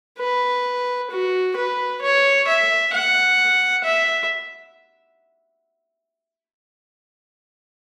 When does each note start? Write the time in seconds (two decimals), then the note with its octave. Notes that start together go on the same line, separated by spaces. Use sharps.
0.19 B4
1.11 F#4
1.56 B4
2.02 C#5
2.48 E5
2.94 F#5
3.84 E5